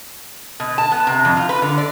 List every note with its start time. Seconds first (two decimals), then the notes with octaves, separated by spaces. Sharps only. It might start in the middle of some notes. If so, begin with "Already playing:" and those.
0.60 B2
0.78 A5
0.92 B3
1.07 C3
1.25 F2
1.37 F4
1.49 B4
1.62 D3
1.78 D5